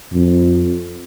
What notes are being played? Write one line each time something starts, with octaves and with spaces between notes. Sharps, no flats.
F2